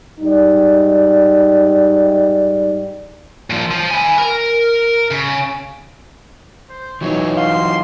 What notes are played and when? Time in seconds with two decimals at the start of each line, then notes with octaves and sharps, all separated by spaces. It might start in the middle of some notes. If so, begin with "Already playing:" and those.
0.19 G#2 G3 D#4 D5
3.50 A#2 F3
3.71 F3
3.91 G#5 B5
4.18 A#4
5.11 C#3
6.69 C5
7.01 E3 F#3 D#4 C#5
7.37 F5 C6